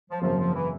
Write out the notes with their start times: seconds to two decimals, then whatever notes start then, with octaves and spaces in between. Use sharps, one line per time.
0.11 F3
0.21 G#1 F#2 C#3 F3 F#3 A#3
0.38 F3
0.54 E3